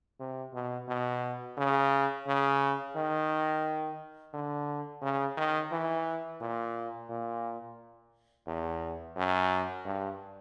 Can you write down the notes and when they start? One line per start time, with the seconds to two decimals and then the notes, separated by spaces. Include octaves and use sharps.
0.20 C3
0.54 B2
0.89 B2
1.58 C#3
2.27 C#3
2.96 D#3
4.34 D3
5.02 C#3
5.37 D#3
5.72 E3
6.41 A#2
7.10 A#2
8.47 E2
9.16 F#2
9.86 G2